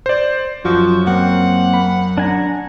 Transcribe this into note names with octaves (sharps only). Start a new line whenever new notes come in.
C5 D5
F#2 F3 F#4
A#3 C4 F#5
B5
D4 G#5 A#5